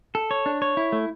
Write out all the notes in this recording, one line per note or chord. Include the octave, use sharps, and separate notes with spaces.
A4
C#5
D4
C#5
E4
A3